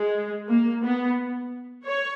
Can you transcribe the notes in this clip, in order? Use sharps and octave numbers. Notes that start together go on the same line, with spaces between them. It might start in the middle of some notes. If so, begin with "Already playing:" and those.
Already playing: G#3
A#3
B3
C#5